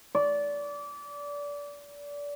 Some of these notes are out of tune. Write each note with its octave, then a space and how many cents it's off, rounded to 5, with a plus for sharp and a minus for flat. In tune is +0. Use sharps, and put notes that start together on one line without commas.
D5 -25